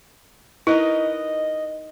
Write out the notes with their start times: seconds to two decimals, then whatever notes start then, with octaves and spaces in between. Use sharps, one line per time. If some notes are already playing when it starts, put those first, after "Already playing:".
0.67 D#4 E4 A#4 B4 D#5